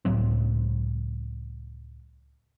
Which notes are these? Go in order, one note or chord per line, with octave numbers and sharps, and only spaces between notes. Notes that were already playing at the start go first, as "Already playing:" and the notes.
C#2 A2 F#3 C4